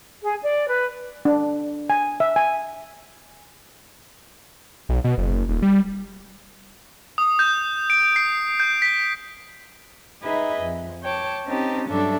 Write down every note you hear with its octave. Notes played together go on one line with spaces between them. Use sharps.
G#4
D5
B4
D4
G#5
E5
G#5
B1
B2
F#1
D#1
G3
D#6
G6
D7
C7
G6
B6
D#4 G#4 B4 D#5 E5 B5
F2
C#5 G5 A5 D6
C4 C#4 D#4 G4 A5
G2 F#3 D4 A4 E5